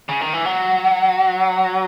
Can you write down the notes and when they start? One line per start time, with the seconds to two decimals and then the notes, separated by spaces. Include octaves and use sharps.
0.09 C#3
0.21 D#3
0.33 E3
0.45 F#3